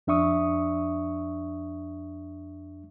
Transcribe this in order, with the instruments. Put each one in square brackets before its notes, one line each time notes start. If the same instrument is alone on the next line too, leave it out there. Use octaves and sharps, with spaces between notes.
[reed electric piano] F2 D4 E5 C#6 D#6